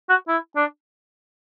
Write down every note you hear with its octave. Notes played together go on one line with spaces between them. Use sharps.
F#4
E4
D4